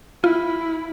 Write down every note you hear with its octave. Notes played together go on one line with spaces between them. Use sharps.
E4 F4